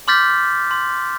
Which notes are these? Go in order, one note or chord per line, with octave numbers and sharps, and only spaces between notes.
C6 D6 F6 G6 A6 B6
C6